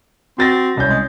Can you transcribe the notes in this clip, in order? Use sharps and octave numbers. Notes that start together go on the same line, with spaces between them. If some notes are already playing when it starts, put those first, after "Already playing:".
C4 F#4 A6 A#6
C2 G3 C#4 G6
G#3